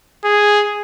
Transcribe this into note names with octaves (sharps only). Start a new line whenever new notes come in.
G#4